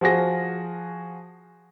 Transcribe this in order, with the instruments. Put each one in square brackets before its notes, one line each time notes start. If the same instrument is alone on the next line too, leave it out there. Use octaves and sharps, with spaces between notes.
[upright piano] F3 F#4 G#4 A#6